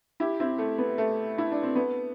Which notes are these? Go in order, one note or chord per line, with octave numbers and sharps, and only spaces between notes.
E4 G4
C4 E4
A3
B3
A3
E4
D4
C4
B3